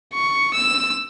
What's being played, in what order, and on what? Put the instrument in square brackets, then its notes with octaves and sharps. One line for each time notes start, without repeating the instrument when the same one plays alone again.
[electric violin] C#6
E6